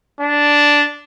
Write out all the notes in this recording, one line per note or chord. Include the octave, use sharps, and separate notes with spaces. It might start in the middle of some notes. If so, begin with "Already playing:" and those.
D4